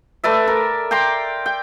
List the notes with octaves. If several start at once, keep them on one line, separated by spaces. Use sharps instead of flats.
A3 B4 D5 E5
A#4
G5 A#5 C6 D6
G5